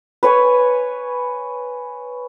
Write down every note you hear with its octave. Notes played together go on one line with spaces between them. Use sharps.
B4 C#5 G#5